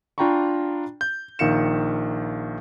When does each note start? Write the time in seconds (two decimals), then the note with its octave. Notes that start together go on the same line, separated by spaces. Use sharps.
0.18 D4 F4 G5 A#5 B5 C#6
1.01 G6
1.39 A#1 D#3 F5 C#7 E7